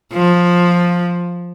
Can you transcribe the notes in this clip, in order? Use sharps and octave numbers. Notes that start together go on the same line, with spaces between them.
F3